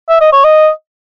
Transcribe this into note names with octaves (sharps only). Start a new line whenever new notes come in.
E5
D#5
C#5
D#5